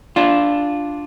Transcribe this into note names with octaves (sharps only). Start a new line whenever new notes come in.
D4 F4